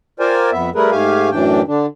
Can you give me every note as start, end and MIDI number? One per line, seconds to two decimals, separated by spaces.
0.20 0.50 65
0.20 0.50 70
0.20 0.50 72
0.20 0.50 74
0.20 0.50 79
0.20 0.50 80
0.52 0.70 41
0.52 0.70 59
0.52 0.70 76
0.75 0.90 55
0.75 0.90 57
0.75 0.90 64
0.75 0.90 68
0.75 0.90 70
0.75 0.90 71
0.91 1.30 44
0.91 1.30 57
0.91 1.30 67
0.91 1.30 77
0.91 1.30 80
1.32 1.61 42
1.32 1.61 45
1.32 1.61 52
1.32 1.61 62
1.32 1.61 79
1.67 1.86 50
1.67 1.86 62